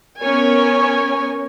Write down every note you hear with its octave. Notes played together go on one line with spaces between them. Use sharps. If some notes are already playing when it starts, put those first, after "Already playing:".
B3 C#4 A#4 C#5 G#5